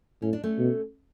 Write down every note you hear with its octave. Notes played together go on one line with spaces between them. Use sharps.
A2 C#4
D4
A3 C#4
B2